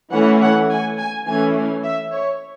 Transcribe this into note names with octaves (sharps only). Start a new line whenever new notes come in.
E3 A3 C#4 F#5
F#5
G#5
G#5
E3 A3 C#4 G#5
E5
C#5